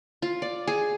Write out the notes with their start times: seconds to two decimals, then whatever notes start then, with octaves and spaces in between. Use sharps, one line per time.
0.22 F4
0.42 D5
0.67 G#4